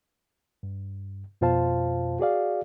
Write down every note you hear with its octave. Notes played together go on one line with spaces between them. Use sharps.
G2
F2 B2 F4 C5 F5 A5
F#4 G#4 D5 F5